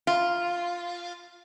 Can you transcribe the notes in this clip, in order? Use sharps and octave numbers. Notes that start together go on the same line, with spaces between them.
F4